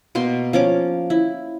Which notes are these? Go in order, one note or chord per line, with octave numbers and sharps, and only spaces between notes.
B2 A#3 C6
F3 C#4 D6
E4